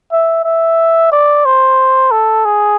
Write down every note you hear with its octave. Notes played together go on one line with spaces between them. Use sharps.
E5
E5
D5
C5
A4
G#4